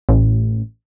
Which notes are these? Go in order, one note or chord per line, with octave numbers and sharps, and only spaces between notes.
A1